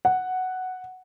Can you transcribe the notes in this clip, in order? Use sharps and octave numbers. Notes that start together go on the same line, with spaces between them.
F#5